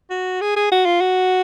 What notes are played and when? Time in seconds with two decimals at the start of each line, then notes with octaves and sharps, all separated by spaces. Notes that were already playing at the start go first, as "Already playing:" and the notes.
0.10 F#4
0.41 G#4
0.56 G#4
0.72 F#4
0.86 F4
1.01 F#4